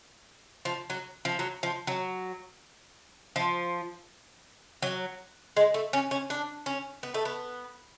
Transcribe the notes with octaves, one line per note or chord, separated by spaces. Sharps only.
F3
F#3
F3
F#3
F3
F#3
F3
F#3
G#3
A3
C#4
C#4
D4
C#4
B3
A3
B3